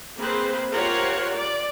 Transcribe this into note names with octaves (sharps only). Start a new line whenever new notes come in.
A#3 C4 G#4 B4 C5
F4 G4 A#4 C5 C#5 F#5
D5